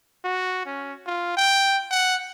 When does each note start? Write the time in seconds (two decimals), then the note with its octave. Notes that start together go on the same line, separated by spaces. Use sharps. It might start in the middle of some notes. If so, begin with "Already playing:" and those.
0.24 F#4
0.66 C#4
1.06 F4
1.37 G5
1.91 F#5